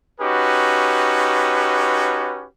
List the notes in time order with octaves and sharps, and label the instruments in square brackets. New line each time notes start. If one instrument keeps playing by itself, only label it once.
[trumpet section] C#4 D#4 F#4 G4 B4